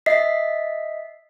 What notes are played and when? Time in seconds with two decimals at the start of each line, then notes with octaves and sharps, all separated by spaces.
0.06 D#5 E5 B6 C7